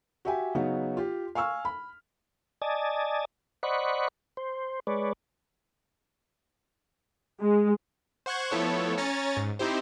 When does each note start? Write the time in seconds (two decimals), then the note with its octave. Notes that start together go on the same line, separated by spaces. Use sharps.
0.25 F#4 G4 E5 G5 G#5
0.55 C#3 F#3 B3 D#4 F#4
0.97 F4 G4
1.35 F5 G#5 C#6 E6 F6
1.65 B5
2.62 D5 D#5 G#5 A5
3.63 C5 D5 D#5 F#5 B5 C#6
4.37 C5
4.87 G#3 B4 C#5 D5
7.39 G#3
8.26 C5 F#5 C#6 F#6 G#6
8.51 F3 A3 B3 E4 A4 C#5
8.98 C#4 C#5 G#5 A#5 A6
9.37 G#2
9.59 C4 D#4 E4 G4 C5